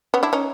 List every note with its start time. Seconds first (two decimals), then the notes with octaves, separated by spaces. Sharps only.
0.14 B3 C#4
0.23 D4 E4
0.33 C#4 D#4